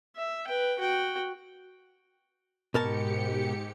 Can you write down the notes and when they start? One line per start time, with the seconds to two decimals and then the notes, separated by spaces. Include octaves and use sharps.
0.16 E5
0.47 B4 G5
0.79 F#4 G5
2.74 G#2 B2 G4 A#4 A5 C#7